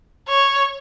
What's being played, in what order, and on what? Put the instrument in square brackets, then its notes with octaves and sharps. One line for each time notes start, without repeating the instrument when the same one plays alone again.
[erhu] C#5